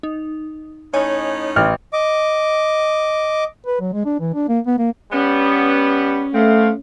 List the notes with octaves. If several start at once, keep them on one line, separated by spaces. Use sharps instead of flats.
D#4
A2 C#4 D#4 C#5 D#5 G#5
A1 F6
D#5 D6
B4
F#3
G#3
D4
E3
D4
A#3
B3
A#3
G3 B3 C#4
A3 B3 C4 F5